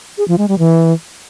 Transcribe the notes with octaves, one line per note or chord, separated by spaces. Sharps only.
G#4
F3
G#3
G3
E3